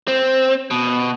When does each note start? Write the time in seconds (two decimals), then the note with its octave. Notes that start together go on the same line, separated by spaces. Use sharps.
0.08 C4
0.71 B2